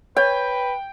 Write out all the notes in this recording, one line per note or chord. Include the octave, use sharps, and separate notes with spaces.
B4 C#5 G5